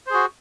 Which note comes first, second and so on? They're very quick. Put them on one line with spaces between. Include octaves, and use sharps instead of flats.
C5 G#4 F#4